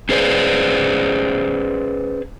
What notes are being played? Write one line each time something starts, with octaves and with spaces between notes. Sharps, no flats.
C#4 G#4 B4 C5 D5